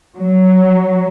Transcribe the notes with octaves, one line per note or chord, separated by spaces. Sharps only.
F#3